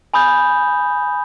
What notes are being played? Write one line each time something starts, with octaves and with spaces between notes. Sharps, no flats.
G#5 B5 D#6 G6